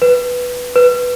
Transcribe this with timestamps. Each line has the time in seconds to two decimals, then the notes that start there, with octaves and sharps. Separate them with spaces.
0.02 B4
0.76 B4